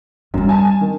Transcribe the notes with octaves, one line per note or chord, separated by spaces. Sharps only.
F#2 D#3 G3
G#5 A5
D#3